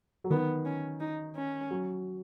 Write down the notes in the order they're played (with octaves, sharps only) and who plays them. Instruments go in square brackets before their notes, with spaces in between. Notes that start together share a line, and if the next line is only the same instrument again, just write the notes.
[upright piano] F#3
[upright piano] D#3 [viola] B3
[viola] C#4
D#4
C#4
[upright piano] F#3